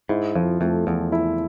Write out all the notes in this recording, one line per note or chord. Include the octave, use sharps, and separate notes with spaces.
G#2 E4
F2 F3
F2 A3
E2 F3
E4